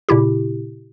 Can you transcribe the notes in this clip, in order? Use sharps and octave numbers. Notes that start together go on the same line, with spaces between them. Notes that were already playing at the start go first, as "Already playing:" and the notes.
A#2 C#3 E4 G4